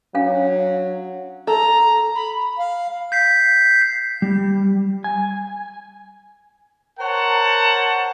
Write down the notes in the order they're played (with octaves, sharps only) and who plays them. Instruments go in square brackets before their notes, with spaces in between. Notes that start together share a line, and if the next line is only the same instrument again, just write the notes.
[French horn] F#3 [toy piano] C#4 D4 F5
[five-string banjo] A4 [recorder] A#5
[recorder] B5
[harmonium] F5
[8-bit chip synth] G6 B6 C7
[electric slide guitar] G3
G#5
[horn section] A#4 C5 C#5 F#5 A5